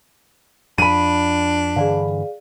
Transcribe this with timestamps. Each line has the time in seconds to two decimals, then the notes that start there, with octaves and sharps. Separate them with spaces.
0.78 F2 D4 B5 D#7
1.76 G2 D3 E3 G#4 D5 F5